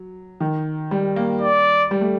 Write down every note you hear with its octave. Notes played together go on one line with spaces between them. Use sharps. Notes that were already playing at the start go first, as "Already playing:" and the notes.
Already playing: F#3
D#3
G3
A#3
D5
G3
A3